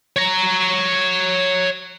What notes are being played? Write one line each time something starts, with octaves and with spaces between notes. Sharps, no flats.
C#5 A#5